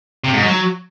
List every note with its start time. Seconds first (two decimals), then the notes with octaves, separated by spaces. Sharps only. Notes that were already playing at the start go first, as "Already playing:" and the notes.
0.24 C3
0.34 G#2
0.43 F#3